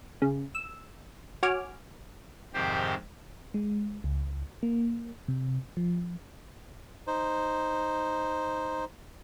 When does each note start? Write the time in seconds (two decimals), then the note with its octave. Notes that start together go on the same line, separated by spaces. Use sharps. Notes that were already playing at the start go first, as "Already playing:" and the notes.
0.22 C#3
0.55 E6
1.43 F#4 C#5 G#5 D6 F6
2.54 F2 G#2 C3 D#3 G4 C5
3.54 G#3
4.04 C#2
4.63 A#3
5.28 C3
5.77 F3
7.07 D#4 C5